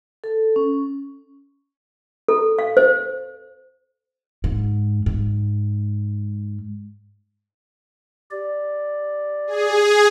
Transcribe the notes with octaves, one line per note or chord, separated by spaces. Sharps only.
A4
C#4
A4
F5
C5
G#2
G#2
G4 D5
G#4